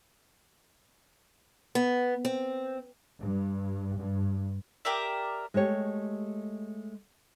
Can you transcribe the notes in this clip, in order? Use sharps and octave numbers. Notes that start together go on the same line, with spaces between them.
B3
C4
G2
G2
G4 A#4 D5 E5
G#3 A3 G4 C#5